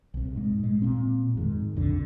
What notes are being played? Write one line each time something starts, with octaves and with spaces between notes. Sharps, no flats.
C2 C3
G#2 G#3
A#2 G#3
A#2 C4
F2 G#2 D#3
B1 F2 D3